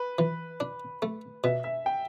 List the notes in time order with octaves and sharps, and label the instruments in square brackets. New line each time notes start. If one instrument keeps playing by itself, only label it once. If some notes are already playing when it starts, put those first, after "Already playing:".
Already playing: [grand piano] B4
[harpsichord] E3
D4
A3
[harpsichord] B2 [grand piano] E5
[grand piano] E5
G5